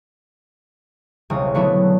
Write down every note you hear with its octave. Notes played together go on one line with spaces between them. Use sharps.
E1 C2 C#3 D#6
D3 F#3 A3 B3 E4